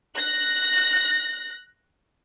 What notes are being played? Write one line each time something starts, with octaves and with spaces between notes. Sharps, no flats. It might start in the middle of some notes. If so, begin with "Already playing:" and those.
F#6 A#6